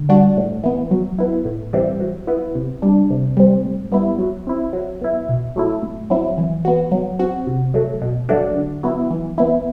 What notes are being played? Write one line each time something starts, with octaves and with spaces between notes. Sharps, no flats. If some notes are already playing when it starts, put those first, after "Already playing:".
Already playing: D3
G3 D4 F#4
A2
E3 B3
F#3
B3 E4
A2
E3 G3 C4 E4
F#3
B3 E4
C3
G3 D4
C3
G3 C4
A2
G3 B3 E4
F#3
C4 E4
F#3
B3 E4
B2
F#3 A3 E4
A2
F#3 C4 E4
E3
B3 F#4
F#3
C4 F#4
C3
F#3 A3
B2
F#3 A3 D4 F#4
D3
F#3 B3 E4
E3
B3 E4